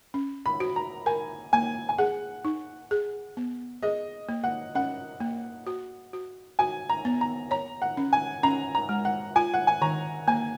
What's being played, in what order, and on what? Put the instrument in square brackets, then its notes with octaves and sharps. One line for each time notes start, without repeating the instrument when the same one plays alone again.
[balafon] C#4
[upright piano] B5
[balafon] F#4
[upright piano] A#5
[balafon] A#4 [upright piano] G#5
[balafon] A#3 [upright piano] G#5
[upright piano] G#5
[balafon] G#4 [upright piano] F#5
[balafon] D#4
G#4
B3
[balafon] G#4 [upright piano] D#5
[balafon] A#3
[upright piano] F#5
[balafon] C#4 [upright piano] F#5
[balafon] A#3
F#4
F#4
[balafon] F#4 [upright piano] G#5
[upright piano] A#5
[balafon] B3
[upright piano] A#5
[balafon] C#5 [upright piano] A#5
[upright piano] F#5
[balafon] C#4
[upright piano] G#5
[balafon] C#4 [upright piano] A#5
[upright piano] A#5
[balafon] G#3
[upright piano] F#5
[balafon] F4 [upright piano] G#5
[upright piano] F#5
G#5
[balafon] D#3 [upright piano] A#5
[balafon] A#3 [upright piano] G#5